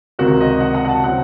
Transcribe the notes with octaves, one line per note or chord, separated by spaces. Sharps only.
C#2 C3 D#3 F#4
D#5
F#5
F#5
F#5
A5
C3 F#3 C4 F#5